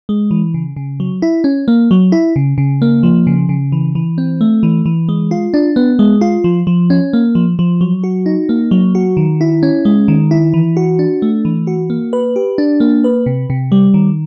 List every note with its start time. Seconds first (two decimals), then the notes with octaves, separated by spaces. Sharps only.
0.09 G#3
0.31 E3
0.54 C#3
0.76 C#3
1.00 F#3
1.22 E4
1.44 C#4
1.68 A#3
1.91 F#3
2.12 E4
2.36 C#3
2.58 C#3
2.82 A#3
3.03 F3
3.27 C#3
3.49 C#3
3.72 E3
3.95 E3
4.18 C4
4.41 A3
4.63 E3
4.86 E3
5.09 G#3
5.31 F4
5.54 D4
5.76 B3
5.99 G#3
6.21 F4
6.44 F3
6.67 F3
6.90 C#4
7.13 A#3
7.35 F3
7.59 F3
7.81 F#3
8.04 F#4
8.26 D#4
8.49 A#3
8.71 F#3
8.95 F#4
9.17 D#3
9.41 E4
9.63 C#4
9.85 G#3
10.08 D#3
10.31 E4
10.54 E3
10.77 F#4
10.99 D4
11.22 A3
11.45 E3
11.67 F#4
11.90 A#3
12.13 B4
12.36 G4
12.58 D4
12.80 A#3
13.04 B4
13.26 C3
13.50 C3
13.72 G3
13.94 D#3